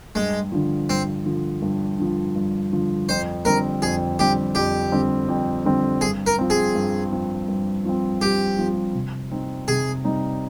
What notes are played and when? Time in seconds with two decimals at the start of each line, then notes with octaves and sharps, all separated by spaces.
0.15 G2 G#3
0.52 D3 F3
0.89 G2 C4
1.26 D3 F3
1.62 G2
1.99 D3 F3
2.36 G2
2.72 D3 F3
3.09 F2 C5
3.45 D3 G3 C4 A#4
3.82 F2 G#4
4.19 D3 G3 C4 G4
4.55 F2 G4
4.92 D3 G3 C4
5.29 F2
5.65 D3 G3 C4
6.01 G2 G#4
6.27 A#4
6.39 F3 C4
6.50 G#4
6.75 G2
7.12 F3 C4
7.48 G2
7.85 F3 C4
8.21 G2 G4
8.59 F3 C4
8.95 C3
9.31 G3 C4 D#4
9.68 C3 G#4
10.04 G3 C4 D#4